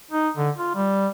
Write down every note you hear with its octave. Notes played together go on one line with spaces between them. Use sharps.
D#4
D3
F4
G3